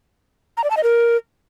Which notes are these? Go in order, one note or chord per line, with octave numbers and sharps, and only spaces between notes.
A#5
D5
A5
D#5
A#4